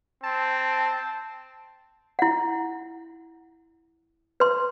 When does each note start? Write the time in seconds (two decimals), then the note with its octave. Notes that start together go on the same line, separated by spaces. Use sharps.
0.23 C4 A5
2.19 E4 F#5
4.40 B4 C6